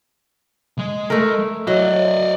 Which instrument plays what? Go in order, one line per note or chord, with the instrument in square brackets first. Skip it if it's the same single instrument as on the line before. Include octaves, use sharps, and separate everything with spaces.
[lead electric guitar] G#3
[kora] A3 A#4
[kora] F#3 [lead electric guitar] D5 D#5